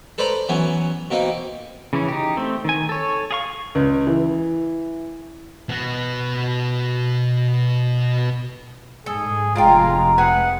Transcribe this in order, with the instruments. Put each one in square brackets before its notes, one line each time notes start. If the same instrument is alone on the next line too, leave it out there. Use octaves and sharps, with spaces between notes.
[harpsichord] A4 B4 C5 D5 A#5 B5
E3 F#3 B3 C#4
B2 A#3 C4 D#4
[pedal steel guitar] C#3 E3 C#4
D#4 G4
A3 C4
D#3 G#5
A4 C#5
G#4 F5 C#6
[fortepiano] C#2
E3
[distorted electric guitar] B2 F#4
[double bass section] G#2 [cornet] G#4 [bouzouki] A4
[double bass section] F1 [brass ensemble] G#3 A#5 [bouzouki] D4 F5 G5 [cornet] F4
[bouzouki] G#4 B4 E5 [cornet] F#5